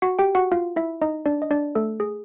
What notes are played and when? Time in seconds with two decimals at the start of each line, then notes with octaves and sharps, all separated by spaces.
0.02 F#4 F#5
0.19 G4 G5
0.35 F#4 F#5
0.52 F4 F5
0.76 E4 E5
1.02 D#4 D#5
1.26 D4 D5
1.42 D#5
1.51 D4 D5
1.75 A3 A4
2.00 G#4